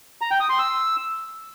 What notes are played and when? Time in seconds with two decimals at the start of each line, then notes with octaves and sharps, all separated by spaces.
0.21 A#5
0.31 G5
0.40 D#6
0.50 C6
0.59 E6